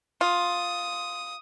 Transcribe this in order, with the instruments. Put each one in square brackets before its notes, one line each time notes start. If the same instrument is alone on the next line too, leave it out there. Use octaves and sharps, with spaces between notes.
[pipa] F4 [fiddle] D#6